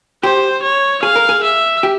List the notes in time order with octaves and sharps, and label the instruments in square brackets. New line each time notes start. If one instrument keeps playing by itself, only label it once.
[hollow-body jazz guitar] G4 [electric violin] C5
[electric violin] C#5
[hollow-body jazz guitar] G#4 [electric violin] F5
[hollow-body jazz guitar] A#4
G#4
[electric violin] E5
[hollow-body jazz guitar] G4